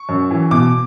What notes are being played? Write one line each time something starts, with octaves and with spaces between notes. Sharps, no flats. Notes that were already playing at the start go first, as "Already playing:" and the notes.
Already playing: C#6
F#2
E3
B2 D6